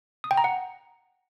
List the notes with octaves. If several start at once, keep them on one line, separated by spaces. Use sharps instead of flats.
D#6
G5
A#5
F#5